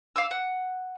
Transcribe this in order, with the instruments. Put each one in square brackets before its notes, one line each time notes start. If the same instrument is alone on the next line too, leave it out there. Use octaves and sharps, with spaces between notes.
[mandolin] F5 D6 E6
F#5